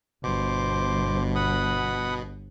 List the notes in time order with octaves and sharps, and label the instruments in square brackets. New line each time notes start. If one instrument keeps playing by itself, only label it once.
[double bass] G1 [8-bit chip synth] B2 [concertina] C5 D6
[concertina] F#5 B5 D#6